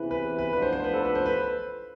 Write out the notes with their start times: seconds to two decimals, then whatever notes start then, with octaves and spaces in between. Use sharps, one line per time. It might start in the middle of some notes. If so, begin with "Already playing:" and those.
Already playing: E2 C3 E3 B4
0.11 B4
0.39 B4
0.53 A2 F3 B3 D4 F4 B4
0.62 C5
0.73 C5
0.84 B4
0.94 A4
1.05 B4
1.15 C5
1.26 B4